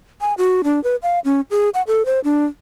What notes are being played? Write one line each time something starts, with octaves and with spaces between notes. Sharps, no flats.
G#5
F#4
D4
B4
F5
C#4
G#4
F#5
A4
C5
D4